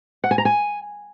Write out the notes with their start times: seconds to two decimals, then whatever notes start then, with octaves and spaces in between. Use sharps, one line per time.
0.24 F#5
0.31 G#5
0.38 A#5
0.45 G#5